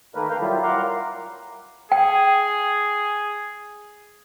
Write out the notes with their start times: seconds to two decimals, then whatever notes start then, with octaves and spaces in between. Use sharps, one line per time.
0.15 D#3 A3 A#3 A#4 B4
0.29 A#4 B4 F5 G5
0.41 F#3 G3 E4 F4 G4
0.63 A#4 F5 F#5 A#5 C6 D6
1.92 G#4 G5